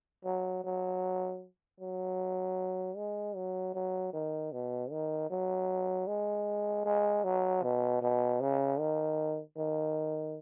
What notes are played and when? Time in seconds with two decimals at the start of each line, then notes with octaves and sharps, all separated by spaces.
0.25 F#3
0.64 F#3
1.80 F#3
2.97 G#3
3.36 F#3
3.74 F#3
4.13 D#3
4.52 B2
4.91 D#3
5.30 F#3
6.07 G#3
6.85 G#3
7.24 F#3
7.63 B2
8.02 B2
8.41 C#3
8.79 D#3
9.57 D#3